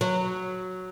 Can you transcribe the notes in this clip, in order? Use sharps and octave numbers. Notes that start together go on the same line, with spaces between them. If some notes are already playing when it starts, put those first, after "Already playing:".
F#3